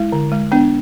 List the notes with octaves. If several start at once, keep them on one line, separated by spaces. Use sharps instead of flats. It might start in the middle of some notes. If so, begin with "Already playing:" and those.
Already playing: G#3 E4
D3
G#3
B3 D4